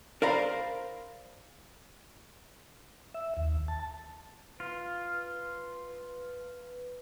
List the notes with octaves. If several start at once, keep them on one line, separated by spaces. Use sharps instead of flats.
A#4 C5 D5 F5 A#5 B5
E5
D#2
A5
F4 B4